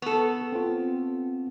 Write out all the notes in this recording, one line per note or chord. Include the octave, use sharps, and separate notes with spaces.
B3 A4 C#6
C4 F4